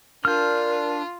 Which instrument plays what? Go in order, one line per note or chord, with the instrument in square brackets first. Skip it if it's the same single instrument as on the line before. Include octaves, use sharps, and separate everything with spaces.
[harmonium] D4 [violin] F4 [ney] A#4 [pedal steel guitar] F6 G6